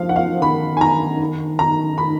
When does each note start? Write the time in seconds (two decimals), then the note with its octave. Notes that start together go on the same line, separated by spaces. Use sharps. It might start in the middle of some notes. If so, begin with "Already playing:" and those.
Already playing: F3 F5
0.09 F#5
0.16 F5
0.30 F3
0.41 D#3 B5
0.77 G#5
0.81 A#5
1.59 A#5
1.98 B5